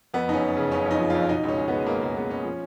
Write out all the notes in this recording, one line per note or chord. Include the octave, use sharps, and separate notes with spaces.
F2 B3
F#1 C#4 D#4
F#1
C#3
F#1 C#4
F2 D#4
F3
F2 F4
B2 D#4
C#2 C#4
C#2
G#3 B3
C#2 A#3
C#2 A#3
G#3 B3
C#2 C#4
F3